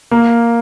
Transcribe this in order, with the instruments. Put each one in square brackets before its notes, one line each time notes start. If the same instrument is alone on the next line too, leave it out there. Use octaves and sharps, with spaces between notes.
[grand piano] A#3